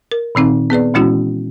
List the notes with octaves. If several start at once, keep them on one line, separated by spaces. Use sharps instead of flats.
A#4
A#2 D#3 C4 D#4
B3 G#4 B4 D5
A#2 E3 G#3 C#4 E4 F#4